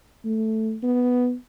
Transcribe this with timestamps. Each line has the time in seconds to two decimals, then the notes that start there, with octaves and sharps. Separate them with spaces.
0.25 A3
0.83 B3